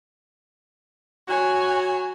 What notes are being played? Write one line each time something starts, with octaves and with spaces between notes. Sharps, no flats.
F#3 F#4 C#5 G#5